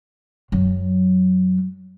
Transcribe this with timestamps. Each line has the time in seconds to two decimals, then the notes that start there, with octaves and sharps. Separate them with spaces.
0.52 F#2 F#3